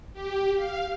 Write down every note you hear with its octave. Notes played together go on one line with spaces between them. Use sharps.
G4
F5